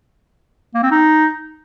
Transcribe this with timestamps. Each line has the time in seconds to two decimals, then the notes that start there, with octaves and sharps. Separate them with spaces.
0.74 A#3
0.83 C4
0.91 D#4